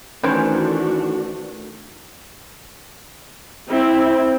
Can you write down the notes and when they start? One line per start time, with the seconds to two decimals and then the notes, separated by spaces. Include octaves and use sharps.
0.23 D#3 E3 A3 C#4 D4 F#4 C5
3.69 C4 E4